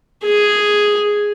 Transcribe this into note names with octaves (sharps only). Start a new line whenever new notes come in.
G#4